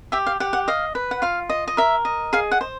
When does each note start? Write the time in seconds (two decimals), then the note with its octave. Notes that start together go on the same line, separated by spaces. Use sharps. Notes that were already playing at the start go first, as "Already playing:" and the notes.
0.12 G4 E5
0.27 F5
0.40 G4 F#5
0.53 F#5
0.68 D#5 F5
0.95 B4
1.11 F#5
1.22 F4 F5
1.50 D#5
1.68 D#5
1.77 A#4 E5
2.05 D#5
2.33 G#4 F5
2.52 F#5
2.61 C5